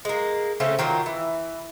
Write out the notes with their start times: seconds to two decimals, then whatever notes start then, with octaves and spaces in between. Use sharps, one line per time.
0.05 G#3 A#3
0.60 C#3 A3 C4 C#4
0.79 D#3 F#3 A#3 F4
1.06 E3